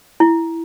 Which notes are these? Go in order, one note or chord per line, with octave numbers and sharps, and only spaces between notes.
E4